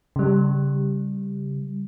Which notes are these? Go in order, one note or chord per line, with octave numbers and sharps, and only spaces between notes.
C#3 G3